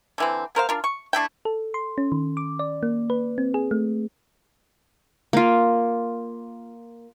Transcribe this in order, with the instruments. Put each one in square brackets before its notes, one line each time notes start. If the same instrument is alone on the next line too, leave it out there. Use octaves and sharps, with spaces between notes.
[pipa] D3 E3 C4
B3 A#4 C5 F5
D4 F4 A#4
C#6
A3 D4 E4 G5
[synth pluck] A4
C6
C#4
D#3
D6
D5
A#3
B4
C4
G#4
A3
[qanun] A#3 F4